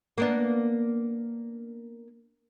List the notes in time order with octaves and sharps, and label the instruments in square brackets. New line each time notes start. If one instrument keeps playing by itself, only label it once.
[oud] A#3 B3 D4